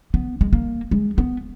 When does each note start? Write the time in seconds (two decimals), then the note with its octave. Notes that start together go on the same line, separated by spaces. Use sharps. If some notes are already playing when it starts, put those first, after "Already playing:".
0.14 B3
0.41 G#3
0.53 A#3
0.91 G#3
1.18 B3